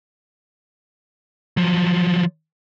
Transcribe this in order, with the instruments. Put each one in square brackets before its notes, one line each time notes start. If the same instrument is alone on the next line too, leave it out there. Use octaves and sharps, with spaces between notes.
[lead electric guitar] F3 F#3